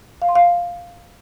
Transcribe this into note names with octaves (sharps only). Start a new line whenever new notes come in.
F5
C6
F5